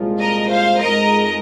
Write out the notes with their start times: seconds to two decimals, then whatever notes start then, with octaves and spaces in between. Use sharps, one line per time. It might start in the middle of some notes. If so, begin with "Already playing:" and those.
Already playing: C2 A#2 F3 G#3 F4
0.20 A#4 D#5
0.51 C5 F5
0.82 F2 F3 G#3 D#4 A#4 D#5